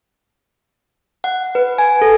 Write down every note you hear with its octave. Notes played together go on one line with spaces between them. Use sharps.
F#5
B4
G#5
A4